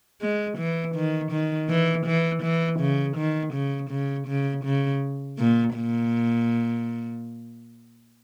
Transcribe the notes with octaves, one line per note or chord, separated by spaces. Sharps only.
G#3
E3
D#3
D#3
E3
E3
E3
C#3
D#3
C#3
C#3
C#3
C#3
A#2
A#2